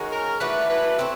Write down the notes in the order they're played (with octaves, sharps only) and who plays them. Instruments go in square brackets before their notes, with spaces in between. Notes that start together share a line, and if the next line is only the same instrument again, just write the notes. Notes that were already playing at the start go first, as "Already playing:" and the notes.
Already playing: [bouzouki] D#3 G#3 C#4 F#4
[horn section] A#4
[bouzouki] E3 A3 D4 F#4 [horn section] B4
[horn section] B4
[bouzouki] A3 C4 E4